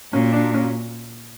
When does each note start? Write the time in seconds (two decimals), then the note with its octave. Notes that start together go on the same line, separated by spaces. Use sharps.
0.12 A#2 C#4
0.33 D4
0.54 C#4